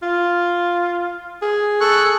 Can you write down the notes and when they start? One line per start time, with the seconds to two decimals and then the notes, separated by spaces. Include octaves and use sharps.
0.02 F4
1.42 G#4
1.81 A4 C#6 F#6